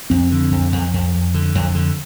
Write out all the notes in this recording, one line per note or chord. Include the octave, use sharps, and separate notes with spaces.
F2 C4
D3
F2
F2
F2
F2
D3
F2
D3